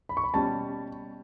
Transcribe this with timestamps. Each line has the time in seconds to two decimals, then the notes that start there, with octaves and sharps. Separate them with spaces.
0.09 B5
0.17 C#6
0.24 B5
0.34 B2 G3 C#4 A5